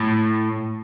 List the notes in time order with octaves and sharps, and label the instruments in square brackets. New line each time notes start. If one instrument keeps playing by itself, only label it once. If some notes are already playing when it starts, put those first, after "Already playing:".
Already playing: [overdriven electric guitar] A2